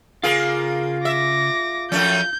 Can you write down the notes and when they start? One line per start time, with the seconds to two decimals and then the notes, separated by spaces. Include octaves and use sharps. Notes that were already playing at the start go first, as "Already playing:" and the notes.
0.24 C#3 A#3 F4 G#4 F5
1.05 E5 D6 A#6
1.92 F#2 F3 A3 C#4 G6